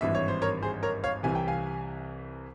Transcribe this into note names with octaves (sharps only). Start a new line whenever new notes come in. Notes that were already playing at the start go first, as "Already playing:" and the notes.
G#1 G2 E3 E5
C#5
C5
A#4 C#5
G#4 C5
A#4 C#5
C#5 F5
C2 C3 E3 G#5
G5
F5 G#5